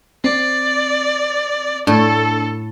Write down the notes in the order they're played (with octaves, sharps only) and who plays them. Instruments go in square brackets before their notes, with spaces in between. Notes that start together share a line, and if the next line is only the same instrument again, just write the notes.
[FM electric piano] C4 [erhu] D5
[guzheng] A2 [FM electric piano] D4 [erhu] A4